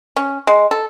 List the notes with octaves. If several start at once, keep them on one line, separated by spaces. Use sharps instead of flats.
C#4
G#3
A4